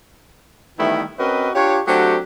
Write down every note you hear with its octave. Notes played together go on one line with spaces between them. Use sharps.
D#3 E3 G3 A3 B3 E4
C4 C#4 F#4 A#4 B4 D#5
D4 F4 G4 C#5
F#3 A3 C4 D4 F#4 G4